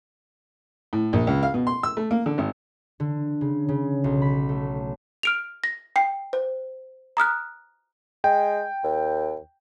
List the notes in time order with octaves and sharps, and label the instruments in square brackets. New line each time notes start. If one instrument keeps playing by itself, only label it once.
[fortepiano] A2
A#1
C#2
F5
B2
C6
E6
A3
A#3
D3
G#1
[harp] D3
C#3
C#3
B1
B5
A3
[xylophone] F6 D7 F7
A#6
G5 C7
C5
A#5 D#6 F6 F#6
[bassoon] G#3 [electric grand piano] G5
[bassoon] D#2